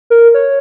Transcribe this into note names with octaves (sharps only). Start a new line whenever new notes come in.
A#4
C#5